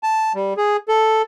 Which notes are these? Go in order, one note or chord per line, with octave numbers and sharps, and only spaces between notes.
A5
G3
G#4
A4